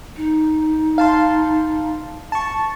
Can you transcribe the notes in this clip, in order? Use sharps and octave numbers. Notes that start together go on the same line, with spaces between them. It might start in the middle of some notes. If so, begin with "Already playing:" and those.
D#4
F5 A5 C6
A5 C#6